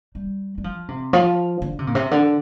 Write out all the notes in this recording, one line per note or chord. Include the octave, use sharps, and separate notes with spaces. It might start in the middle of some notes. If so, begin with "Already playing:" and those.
G3
G3
F3
C3
F3
D3
C3
A#2
C3
D3